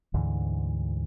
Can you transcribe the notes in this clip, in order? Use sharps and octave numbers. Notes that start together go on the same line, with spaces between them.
D2 G#2 D3 E3